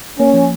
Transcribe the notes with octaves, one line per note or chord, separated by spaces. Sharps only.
A#3 C#4
F3